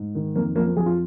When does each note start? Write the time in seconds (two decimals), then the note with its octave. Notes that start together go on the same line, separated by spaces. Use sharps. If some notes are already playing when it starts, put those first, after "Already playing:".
Already playing: G#2
0.15 D#3
0.35 F2 A#3
0.56 F3 A#3
0.66 A#3
0.76 F2 G#4
0.86 F4